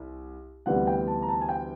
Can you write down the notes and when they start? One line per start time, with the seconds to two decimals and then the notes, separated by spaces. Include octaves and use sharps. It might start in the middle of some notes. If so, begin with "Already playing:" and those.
Already playing: C2
0.66 D2 C3 E3 G3 B3 F#5
0.87 G5
1.07 A5
1.22 A#5
1.28 A5
1.41 G#5
1.49 G5